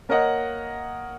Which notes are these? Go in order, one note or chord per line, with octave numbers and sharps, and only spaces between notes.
A#3 A#4 C#5 D#5 F#5